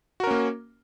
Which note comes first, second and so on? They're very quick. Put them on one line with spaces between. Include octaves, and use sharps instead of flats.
F#4 A#4 C#4 A#3